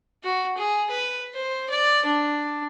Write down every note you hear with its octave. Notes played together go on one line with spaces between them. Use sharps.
F#4
G#4
B4
C5
D5
D4